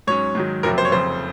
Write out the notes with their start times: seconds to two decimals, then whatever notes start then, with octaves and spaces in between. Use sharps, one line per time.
0.07 G#2 F#3 C#4 C#5
0.35 G#2 D#3 F#3
0.63 F#1 F2 C3 F#3 A#4
0.78 C5
0.85 C#5
0.92 F1 F2 C#3 C5